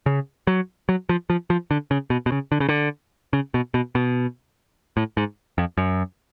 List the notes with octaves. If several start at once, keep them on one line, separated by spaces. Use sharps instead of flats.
C#3
F#3
F#3
F3
F3
F3
D3
C#3
B2
B2
C#3
D3
C#3
D3
C#3
B2
B2
B2
A2
G#2
F2
F#2